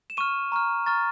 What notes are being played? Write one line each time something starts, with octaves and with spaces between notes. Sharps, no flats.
E7
C#6 F6 D#7
A#5 C#6 F6
A#5 C#6 F6 A6